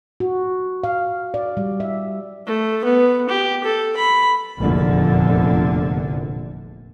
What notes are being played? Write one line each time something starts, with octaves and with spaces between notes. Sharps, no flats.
F#4
F5
D5
G3
E5
A3
B3
G4
A4
B5
F1 A#1 E2 A#2 D3